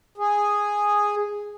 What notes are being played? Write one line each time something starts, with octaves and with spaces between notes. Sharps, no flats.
G#4